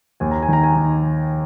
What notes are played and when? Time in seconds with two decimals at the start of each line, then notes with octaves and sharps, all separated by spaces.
0.20 D#2 G#5
0.31 A#5
0.42 G#5
0.48 D#3 A#5
0.63 G#5
0.75 D#3